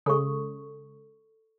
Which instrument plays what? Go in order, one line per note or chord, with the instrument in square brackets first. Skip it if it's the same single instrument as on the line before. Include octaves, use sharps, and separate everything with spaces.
[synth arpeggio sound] C#3 G#3 [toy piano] A4 C#6